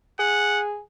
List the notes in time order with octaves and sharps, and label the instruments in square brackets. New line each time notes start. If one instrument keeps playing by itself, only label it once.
[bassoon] G#4 [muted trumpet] F#5